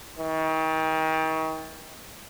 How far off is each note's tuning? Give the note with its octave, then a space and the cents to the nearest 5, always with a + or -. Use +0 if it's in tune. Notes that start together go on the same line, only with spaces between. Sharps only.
D#3 +35